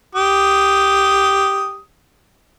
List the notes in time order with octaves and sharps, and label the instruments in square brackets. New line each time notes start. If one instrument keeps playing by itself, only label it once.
[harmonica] G4 D#6